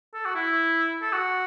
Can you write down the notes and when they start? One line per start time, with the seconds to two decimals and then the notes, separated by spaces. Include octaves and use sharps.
0.14 A4
0.25 F#4
0.35 E4
1.02 A4
1.13 F#4